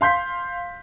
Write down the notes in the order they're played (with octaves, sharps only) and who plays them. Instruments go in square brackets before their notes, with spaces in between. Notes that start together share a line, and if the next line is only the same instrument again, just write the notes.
[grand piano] F5 C6 G6 B6